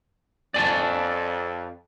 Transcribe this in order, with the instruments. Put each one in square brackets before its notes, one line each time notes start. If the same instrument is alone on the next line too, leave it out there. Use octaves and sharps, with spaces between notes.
[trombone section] F2 [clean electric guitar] D5 G#5 A5